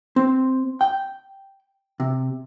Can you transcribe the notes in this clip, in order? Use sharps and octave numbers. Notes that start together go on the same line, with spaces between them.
C4
G5
C3